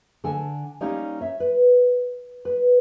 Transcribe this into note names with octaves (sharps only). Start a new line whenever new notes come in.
D3 A4 G#5 A5
G3 A#3 C#4 D#4 G4
C#5 E5
B4
B4